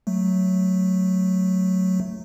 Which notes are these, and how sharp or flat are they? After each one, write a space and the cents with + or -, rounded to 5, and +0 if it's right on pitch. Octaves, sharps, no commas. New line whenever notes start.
F#3 +0 A3 +0